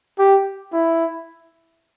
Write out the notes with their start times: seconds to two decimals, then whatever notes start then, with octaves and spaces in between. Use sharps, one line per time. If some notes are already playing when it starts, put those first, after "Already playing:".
0.19 G4
0.73 E4